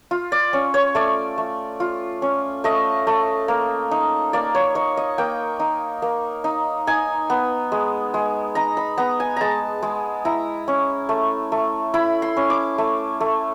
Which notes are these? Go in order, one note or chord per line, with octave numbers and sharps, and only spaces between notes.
F4
D5
C#4 C#5
C#5
A3 D5
A3
F4
C#4
A3 D#5
A3
A#3
D#4
A#3 D5
C#5
D#4 C#5
D#5
A#3 G5
D#4
A#3
D#4
D#4 G#5
B3
G#3
G#3
D#4 A#5
B5
B3 A#5
G#5
G#3 A5 A#5
G#3
E4 A#5
C#4
A3
A3
E4 B5
C6
C#4
D6
A3
A3